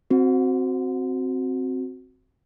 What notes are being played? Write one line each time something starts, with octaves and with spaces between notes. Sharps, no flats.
C4 F#4